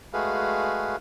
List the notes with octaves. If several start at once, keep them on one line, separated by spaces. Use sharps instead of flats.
G#3 A3 F#4 G#4 B4 F5